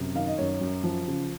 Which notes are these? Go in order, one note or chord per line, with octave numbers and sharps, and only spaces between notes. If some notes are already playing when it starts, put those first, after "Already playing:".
Already playing: F#2 C3
D#3 F5
D#5
F#2 C#5
F#2
F3
C#3